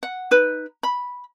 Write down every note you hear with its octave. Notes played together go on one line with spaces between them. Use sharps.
F#5
D#4 B4
B5